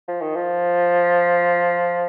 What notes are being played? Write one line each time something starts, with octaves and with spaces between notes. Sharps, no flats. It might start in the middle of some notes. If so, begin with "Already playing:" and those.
F3
D#3
F3